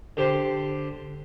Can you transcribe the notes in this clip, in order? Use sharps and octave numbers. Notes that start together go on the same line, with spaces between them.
D3 G4 C5